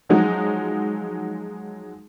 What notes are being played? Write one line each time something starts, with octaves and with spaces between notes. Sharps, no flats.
F3 F#3 G#3 D#4 F#4